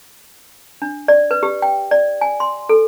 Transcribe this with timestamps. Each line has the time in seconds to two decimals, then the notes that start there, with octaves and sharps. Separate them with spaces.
0.82 D4
1.08 D5
1.31 B4
1.43 G4
1.62 G5
1.91 D5
2.21 G#5
2.40 C6
2.69 A4